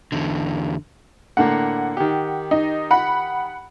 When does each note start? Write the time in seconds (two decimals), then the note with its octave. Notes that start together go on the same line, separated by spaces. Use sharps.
0.12 E2 D3
1.37 A2 D3 A#3 F#5
1.97 D#3 G4
2.51 D#4
2.91 F#5 B5